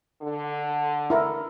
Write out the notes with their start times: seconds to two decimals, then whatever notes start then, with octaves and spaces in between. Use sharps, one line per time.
0.23 D3
1.10 E4 A#4